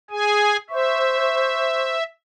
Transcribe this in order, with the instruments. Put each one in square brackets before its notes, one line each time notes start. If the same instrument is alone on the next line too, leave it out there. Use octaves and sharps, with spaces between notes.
[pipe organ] G#4 G#5
[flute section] C5 C#6 [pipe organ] E5